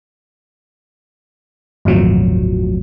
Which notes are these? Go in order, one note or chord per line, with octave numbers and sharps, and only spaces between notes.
G1 D#2 A2 C3 F3 F#3